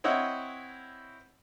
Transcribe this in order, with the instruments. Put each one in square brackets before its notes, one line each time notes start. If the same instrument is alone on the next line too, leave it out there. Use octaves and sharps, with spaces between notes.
[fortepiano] C4 E4 C#5 D#5 E5 F#5